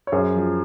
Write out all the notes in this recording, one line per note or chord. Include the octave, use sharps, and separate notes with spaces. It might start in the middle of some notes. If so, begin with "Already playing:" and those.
C#5
F#2 G#4 C5
F3